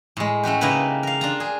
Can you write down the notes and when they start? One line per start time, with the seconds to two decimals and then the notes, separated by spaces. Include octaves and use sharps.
0.17 A2 G#3
0.43 A3 C#4 F#4 G4
0.61 C#3 A#3 D#4 E4 B4 A#5
1.03 A#4 F5
1.21 D4 F4 A#5
1.40 G#4